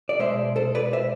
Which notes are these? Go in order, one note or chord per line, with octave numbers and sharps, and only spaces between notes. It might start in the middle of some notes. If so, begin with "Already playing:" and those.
D5
B2 G#3 C5 E5
A4 C5
B4 D5
C5 E5